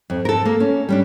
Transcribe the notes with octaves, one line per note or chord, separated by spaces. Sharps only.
F2
A4 A#4
A#3
C#4
G3 C#4 D4